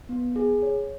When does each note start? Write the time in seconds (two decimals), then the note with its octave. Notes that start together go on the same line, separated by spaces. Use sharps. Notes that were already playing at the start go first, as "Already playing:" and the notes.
0.09 B3
0.36 G#4
0.63 C#5